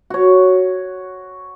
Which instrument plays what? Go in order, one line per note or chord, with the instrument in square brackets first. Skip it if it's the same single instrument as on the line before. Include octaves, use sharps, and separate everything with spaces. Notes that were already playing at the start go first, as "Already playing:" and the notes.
[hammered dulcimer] F#4 C#5